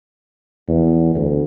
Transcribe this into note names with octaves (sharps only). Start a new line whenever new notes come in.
E2
D2